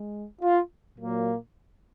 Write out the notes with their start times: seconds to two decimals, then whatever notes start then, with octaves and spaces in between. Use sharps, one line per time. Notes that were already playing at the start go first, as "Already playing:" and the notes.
Already playing: G#3
0.42 F4
0.98 A#2 F#3 A#3